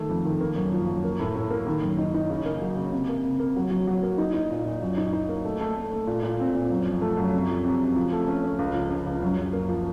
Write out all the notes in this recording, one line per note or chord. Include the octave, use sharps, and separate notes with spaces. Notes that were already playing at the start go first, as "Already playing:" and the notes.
Already playing: D#3 A3
F2
D#3
A#3
F#2
F3
F#2
A#3
A2
A2
A#3
D#3
F#2
D#4
D#4
C#3
A#3
F#3
C#3
C3
A#3
C3
A#3
F#3
F#3
F#3
A#3
D#4
D#4
A#2
A#2
F#2
D#4
D#4
A#3
A3
A3
A3
A3
A#2
A#2
C4
A#2
F#2
F3
A3
F#2
C3
F3
C3
C#2
F3
A3
C#4
C#4
C#2
F3
C#2
C#2
F#2
F#2
A#3
F3